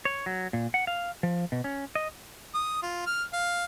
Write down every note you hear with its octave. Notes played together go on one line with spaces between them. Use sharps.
C#5
F#3
A#2
F#5
F5
F3
B2
C#4
D#5
D#6
F4
F6
F5